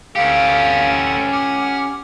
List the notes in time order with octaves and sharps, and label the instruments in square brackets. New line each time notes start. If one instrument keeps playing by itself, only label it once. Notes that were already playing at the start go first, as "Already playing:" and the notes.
[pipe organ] D2 D3 F#5 [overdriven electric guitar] C#4 G4 [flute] F5
[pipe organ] F#5 F6 G#6 [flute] D6